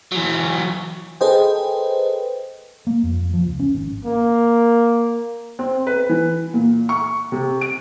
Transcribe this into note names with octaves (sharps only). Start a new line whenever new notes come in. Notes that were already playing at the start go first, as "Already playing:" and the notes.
E3 F#3
G#4 A4 B4 C5 D#5 G5
A#3
F2
F3
C#2
C#4
G#1
A#3
C4
B4
E3
A#2
C#6
C3
D7